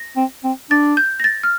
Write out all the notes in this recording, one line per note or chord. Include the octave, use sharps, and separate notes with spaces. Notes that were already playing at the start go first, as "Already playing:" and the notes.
Already playing: A#6
C4
C4
D4 A6
G6
A#6
A6
F6